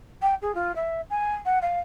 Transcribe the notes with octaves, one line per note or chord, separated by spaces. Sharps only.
G5
G#4
F4
E5
G#5
F#5
F5